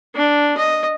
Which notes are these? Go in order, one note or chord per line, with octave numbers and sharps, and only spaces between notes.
D4
D#5